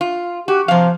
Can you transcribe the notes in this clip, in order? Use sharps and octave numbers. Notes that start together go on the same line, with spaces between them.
F4
F#4 G4
C3 F3 F5